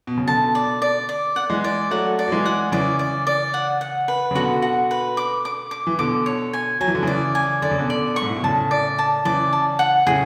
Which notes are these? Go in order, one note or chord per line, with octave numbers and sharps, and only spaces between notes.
B2
C#3
B2 D3 A5
D5
D5
D5
F#5
E3 G#3
D5
F#3 A3 F#5
D5
F#3
E3 G#3
F#5
C#3 E3 D5
D5
D5
F#5
F#5
B4
C#3
B2 D3 F#4
F#4
B4
D6
D6
D6
E3
B2 D3 D6
C#5
G#5
F#3 G#5
E3
D3
C#3 E3 D5
G#5
D3 D5
C#3
B2 D3
D5
C#6
G#2
A2
B2
A2 C#3 A5
D5
A5
C#3 E3 D5
A5
F#5
A2 C#3 G#4